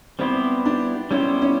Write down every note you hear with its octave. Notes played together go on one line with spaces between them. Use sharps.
G3 B3 C4 E4 G4 C5
D4
G3 B3 C#4 E4 G4 C5
C#4